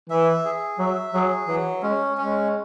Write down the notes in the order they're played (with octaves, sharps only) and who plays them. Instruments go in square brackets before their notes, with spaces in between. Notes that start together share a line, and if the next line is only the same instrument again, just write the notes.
[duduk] E3 [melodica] E5
[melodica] G#4
[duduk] F#3 [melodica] E5
[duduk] F#3 [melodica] G#4
[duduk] E3 [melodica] F#3
[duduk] G#3 [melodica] C#4
[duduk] G#3 [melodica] C#4